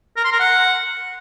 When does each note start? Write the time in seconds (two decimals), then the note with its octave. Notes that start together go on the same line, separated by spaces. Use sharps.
0.17 A#4
0.24 C6
0.32 A#4
0.40 F#5